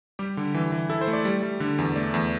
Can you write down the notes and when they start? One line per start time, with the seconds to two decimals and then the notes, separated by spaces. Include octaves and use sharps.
0.19 G3 G4
0.37 D3
0.54 E3
0.72 E3
0.90 E4 A4
1.01 C5
1.08 A3
1.13 D5
1.25 G3
1.43 G3
1.60 D3
1.78 E2
1.96 A3 D5
2.14 E2